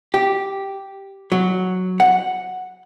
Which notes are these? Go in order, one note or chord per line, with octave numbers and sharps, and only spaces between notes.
G4
F#3
F#5